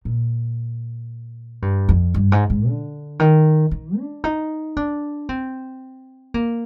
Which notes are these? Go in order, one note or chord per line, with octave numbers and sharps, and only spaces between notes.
A#2
G2
F2
G2
G#2
G#2
D3
D#3
D#3
D4
D#4
D4
C4
A#3